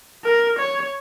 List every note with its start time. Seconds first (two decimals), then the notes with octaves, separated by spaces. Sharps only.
0.24 A#4
0.58 C#5